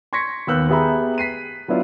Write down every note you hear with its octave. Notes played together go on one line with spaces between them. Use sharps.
C6 C#6 G#6 A#6 B6 C#7
D#2 B3 E6 F#6 G6
B3 G4 G#4 E5 A#5 B5
B6 C7 D#7
F#3 B3 D4 E4 F4